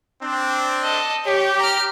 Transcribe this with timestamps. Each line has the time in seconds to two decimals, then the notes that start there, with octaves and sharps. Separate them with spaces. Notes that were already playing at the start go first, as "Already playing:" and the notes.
0.22 C4 D4
0.83 A4 D#5
1.25 G4 C#5
1.59 A#5 F6